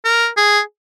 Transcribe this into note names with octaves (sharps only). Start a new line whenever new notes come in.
A#4
G#4